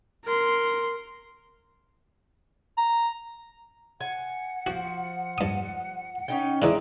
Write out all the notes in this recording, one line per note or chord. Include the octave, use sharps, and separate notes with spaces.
A#4 C6
A#5
F#5 G#5
F3 F#4
G2 D#6
C#4 D#4 G5
D3 E3 G#3 D5 E5 A#5